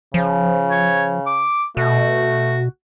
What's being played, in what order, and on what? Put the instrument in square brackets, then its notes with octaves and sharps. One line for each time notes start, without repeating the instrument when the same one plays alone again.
[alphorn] C#3 [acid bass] F3
[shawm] C#5
D6
[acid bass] B2 [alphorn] A3 [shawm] F#4